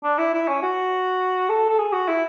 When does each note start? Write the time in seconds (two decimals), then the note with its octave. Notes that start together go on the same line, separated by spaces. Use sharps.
0.04 D4
0.18 E4
0.33 E4
0.48 C#4
0.63 F#4
1.49 A4
1.69 A4
1.78 G#4
1.93 F#4
2.08 E4